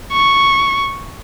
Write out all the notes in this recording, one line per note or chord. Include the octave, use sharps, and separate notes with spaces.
C#6